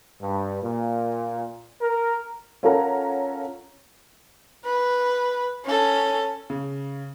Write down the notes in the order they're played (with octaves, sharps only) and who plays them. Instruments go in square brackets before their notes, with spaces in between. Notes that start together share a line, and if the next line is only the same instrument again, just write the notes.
[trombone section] G2
A#2
A#4
[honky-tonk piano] C#4 F4 A4 A#4 F#5 A#5
[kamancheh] B4
C#4 A4
[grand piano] C#3